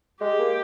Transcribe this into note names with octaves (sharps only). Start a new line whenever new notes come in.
G#3 G4
A#3